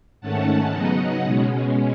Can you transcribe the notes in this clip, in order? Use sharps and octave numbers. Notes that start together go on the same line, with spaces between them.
G#2 D#3 A3 C#4 F#5 A5
C#3 F#3 B3 D#4 D#5 F#5
B2 G#3 C#4